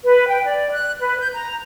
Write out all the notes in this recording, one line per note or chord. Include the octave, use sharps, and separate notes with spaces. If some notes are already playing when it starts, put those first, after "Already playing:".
B4
G5
D5
F#6
B4
G6
A#5